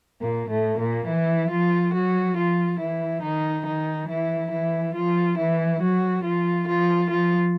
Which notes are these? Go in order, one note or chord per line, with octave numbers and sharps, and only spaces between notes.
A#2 A#3
A2 A3
A#2 A#3
E3 E4
F3 F4
F#3 F#4
F3 F4
E3 E4
D#3 D#4
D#3 D#4
E3 E4
E3 E4
F3 F4
E3 E4
F#3 F#4
F3 F4
F3 F4
F3 F4